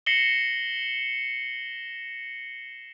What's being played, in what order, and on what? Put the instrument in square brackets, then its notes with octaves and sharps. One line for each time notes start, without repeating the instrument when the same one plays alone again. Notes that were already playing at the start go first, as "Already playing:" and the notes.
[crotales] A#6 C7 C#7 E7 F#7 G7